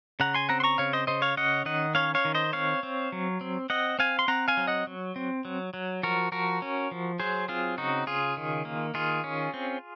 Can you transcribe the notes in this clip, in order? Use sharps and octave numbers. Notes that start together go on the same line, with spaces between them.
C#3 F#5 A#5
G#5 C6
C4 F#5 A#5
C6
A#5 C#6
C#3 C#5 F5
C5 D#5
C#3 C5 D#5
C#5 F5
C#4 D#5 F#5
D#3 D#5 F#5
C#4 C#5 F5
C#5 F5
D#3
C5 D#5
C4 C#5 F5
C4
F#3
C4
C4 D#5 F#5
C4 F5 G#5
C6
C4 F#5 A#5
F5 G#5
F#3
D#5 F#5
F#3
C4
F#3
F#3
F3 F#4 A#4
F3 F#4 A#4
C#4
F3
F#3 G#4 C5
C4 F4 G#4
C#3 D#4 F#4
C#3 F4 G#4
D#3
A#3
D#3 F4 G#4
C#4
C4